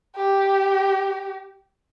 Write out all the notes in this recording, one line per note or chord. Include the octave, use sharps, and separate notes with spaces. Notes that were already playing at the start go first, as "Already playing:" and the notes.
G4